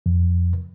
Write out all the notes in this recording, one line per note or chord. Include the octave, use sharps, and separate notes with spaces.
F2